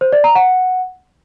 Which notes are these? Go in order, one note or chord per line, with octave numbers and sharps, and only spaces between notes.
C5
D5
A#5
F#5